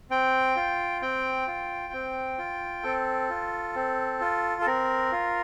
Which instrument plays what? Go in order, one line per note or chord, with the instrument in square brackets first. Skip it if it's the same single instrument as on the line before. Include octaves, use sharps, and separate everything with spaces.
[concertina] C4 G5
F4
C4 G5
F4
C4
F4
C4 A4
F4
C4
F4
A4
C4 A#4
F4